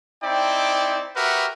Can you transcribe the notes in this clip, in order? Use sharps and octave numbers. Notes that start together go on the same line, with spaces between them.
C4 D#4 E4 D5 G5
F#4 G4 A#4 B4 E5 F#5